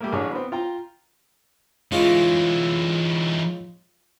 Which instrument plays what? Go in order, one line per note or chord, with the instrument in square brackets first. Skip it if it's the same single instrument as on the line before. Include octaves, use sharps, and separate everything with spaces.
[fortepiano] G3 A3 A#3
A1 F#3 D4 G#4 C#5 D6
B3 C4
F4 G5 A#5
[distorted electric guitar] E3 D#4 [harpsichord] G#3 C#4 F4